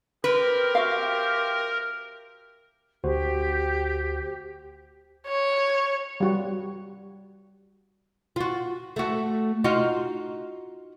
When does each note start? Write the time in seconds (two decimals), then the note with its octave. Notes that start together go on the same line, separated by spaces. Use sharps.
0.24 C4 G4 A#4 B4
0.75 F#4 E5 F5
3.04 D2 F#4 G4 C5
5.27 C#5
6.20 G3 F#4
8.36 F4 F#4
8.96 A3 F#4
9.64 D#4 F4 F#4